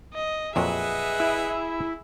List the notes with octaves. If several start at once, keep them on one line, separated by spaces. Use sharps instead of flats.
D#5
F2 A#2 F#3 G#4 B4 D#5 E5 F#5
E4